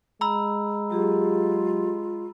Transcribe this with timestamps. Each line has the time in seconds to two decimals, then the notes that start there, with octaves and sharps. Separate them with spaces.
0.21 G#3 A#5 B5 E6
0.91 F#3 F4 G4 G#4